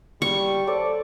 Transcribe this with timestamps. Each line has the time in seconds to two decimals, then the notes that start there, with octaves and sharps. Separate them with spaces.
0.22 G3 C#6
0.67 A4 C5 D5